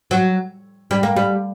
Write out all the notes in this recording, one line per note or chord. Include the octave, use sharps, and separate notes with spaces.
F#3
G3
A#3
G3